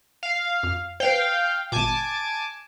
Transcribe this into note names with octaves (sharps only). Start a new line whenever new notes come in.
F5
F2
B4 C5 F5 G5
G1 A#2 G#5 A5 D6